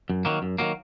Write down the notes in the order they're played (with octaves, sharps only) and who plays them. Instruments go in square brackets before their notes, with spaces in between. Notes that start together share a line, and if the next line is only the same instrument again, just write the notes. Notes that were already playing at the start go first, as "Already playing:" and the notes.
[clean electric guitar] F#2
D#3 F#3 A#3
F#2
D#3 F#3 A#3